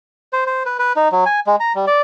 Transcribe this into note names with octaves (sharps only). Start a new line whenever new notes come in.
C5
C5
B4
B4
D#4
F#3
G#5
G#3
A#5
G3
D5